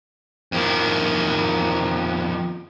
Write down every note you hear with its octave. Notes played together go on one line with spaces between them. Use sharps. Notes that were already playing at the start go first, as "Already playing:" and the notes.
F2 D#3